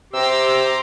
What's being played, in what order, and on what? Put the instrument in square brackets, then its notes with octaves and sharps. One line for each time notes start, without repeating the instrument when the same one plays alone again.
[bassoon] C3 [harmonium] G4 [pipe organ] A#5 C6 D6 [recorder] E6